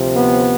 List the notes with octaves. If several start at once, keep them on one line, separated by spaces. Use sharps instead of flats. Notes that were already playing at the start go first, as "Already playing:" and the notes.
Already playing: D2 C3 F3
B3